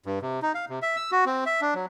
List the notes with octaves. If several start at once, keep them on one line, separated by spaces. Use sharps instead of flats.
G2
C3
D#4
F5
C3
E5
E6
F#4
C4
E5
D4
F#3